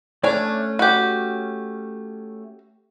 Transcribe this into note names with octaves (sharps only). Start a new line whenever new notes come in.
A3 C#4 D4 C#5 D5
F#4 G4